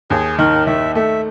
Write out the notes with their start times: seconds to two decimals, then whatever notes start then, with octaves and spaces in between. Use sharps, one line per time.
0.10 D#2 G#4
0.38 D#3 A#4
0.67 D#3 E5
0.95 A3 E5